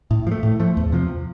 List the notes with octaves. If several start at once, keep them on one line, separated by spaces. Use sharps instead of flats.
A2
F3
A3
A2
F3 A3
E2
C3 F3